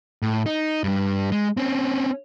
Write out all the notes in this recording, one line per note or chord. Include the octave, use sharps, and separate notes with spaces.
A2
D#4
G2 G3
G#3
C4 C#4